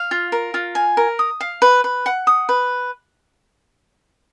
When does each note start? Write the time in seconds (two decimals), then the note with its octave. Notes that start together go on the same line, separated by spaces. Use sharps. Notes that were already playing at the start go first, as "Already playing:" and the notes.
Already playing: F5
0.11 F4
0.32 A#4
0.54 F4
0.75 G#5
0.97 A#4
1.19 D#6
1.40 F5
1.62 B4
1.84 B4
2.06 F#5
2.27 D#6
2.49 B4